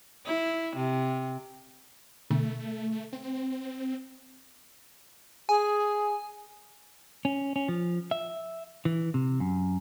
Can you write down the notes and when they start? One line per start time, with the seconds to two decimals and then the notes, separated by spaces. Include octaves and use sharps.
0.26 E4
0.76 C3
2.30 B2 D3 A3
3.13 C4
5.49 G#4 G#5
7.25 C#4
7.56 C#4
7.68 F3
8.11 E5
8.85 E3
9.14 C3
9.40 F#2